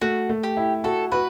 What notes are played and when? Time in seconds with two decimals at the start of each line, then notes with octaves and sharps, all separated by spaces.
0.02 A3 F#4
0.29 A3
0.43 G4
0.57 E4
0.84 F#4 A4
1.12 F#4 B4